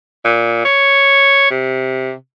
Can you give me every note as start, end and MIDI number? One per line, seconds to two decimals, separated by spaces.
0.24 0.63 46
0.65 1.46 73
1.50 2.13 48